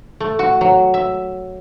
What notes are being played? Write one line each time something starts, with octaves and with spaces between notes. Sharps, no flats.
A3
F#4
F#3
E5